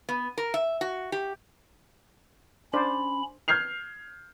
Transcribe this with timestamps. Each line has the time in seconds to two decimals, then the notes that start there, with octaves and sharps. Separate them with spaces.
0.09 B3
0.38 A#4
0.54 E5
0.81 F#4
1.12 G4
2.74 C#4 D4 C5 D5 B5
3.48 F6 G6 G#6 C7 F7